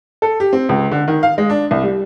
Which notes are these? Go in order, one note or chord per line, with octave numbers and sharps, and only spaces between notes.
A4
G4
C4
C#2
D3
D#3
F5
G#3
D4
C2
G3